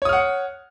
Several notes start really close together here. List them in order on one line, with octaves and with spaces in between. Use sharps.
C#5 D#6 F6 F#5